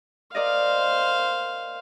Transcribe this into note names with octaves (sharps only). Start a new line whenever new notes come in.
A#4 C5 D5 D#5 F5